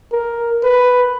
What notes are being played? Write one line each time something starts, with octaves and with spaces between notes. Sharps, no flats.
A#4
B4